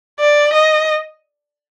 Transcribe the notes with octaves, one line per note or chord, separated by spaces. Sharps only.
D5
D#5